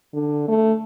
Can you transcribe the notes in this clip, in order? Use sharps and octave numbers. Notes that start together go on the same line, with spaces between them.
D3
A3